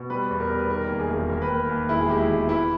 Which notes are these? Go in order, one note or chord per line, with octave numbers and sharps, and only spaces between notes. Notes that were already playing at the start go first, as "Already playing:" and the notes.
Already playing: B2
G3 B4
E2
A#4
G3
B4
D#3 A#4
D#2
G#4
E1
D#2 A#4
B4
D#2
A#4
D#2
E1 E4
G#4
G#3 G4
E4
E1
E3 E4